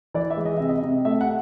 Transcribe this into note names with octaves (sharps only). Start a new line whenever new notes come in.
E3 D5
E5
G#3
D#5
C3 E5
D#5
C3
A3 E5
F#5